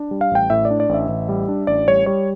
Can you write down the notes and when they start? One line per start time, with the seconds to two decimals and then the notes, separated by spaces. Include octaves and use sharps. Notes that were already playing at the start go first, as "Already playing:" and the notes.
Already playing: D4
0.11 G3
0.21 F5
0.31 A1 G5
0.50 A2 E5
0.65 D5
0.70 D4
0.80 D5
0.89 A1 E5
1.09 A1
1.29 G3
1.48 D4
1.67 A1 D5
1.88 G3 C#5
2.06 G3 C#5